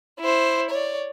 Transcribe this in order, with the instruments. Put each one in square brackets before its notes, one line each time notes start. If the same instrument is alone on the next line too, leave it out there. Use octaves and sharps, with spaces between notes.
[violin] E4 C5
C#5 D5